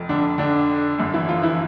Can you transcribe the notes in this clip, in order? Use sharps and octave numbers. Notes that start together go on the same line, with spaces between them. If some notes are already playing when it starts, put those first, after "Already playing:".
Already playing: F1 F2
D3 D4
D3 D4
G1 F#2 D3
E3 E4
F3 F4
E3 E4